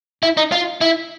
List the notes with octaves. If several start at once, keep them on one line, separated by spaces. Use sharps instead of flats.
E4
D#4
F4
E4